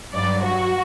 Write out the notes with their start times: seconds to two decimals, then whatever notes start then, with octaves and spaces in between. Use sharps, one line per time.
0.13 G2 F#3 D5
0.42 F#4